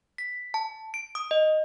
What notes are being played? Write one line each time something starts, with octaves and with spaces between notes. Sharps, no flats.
B6
A5
D7
D#6
D#5